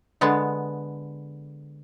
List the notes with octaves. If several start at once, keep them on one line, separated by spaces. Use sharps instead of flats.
D3 G#3 B3